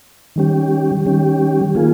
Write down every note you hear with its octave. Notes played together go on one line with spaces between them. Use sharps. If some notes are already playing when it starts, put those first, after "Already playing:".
D#3 G3 C#4 G4
D#3 G3 C#4 G4
D#3 A#3 F4 G#4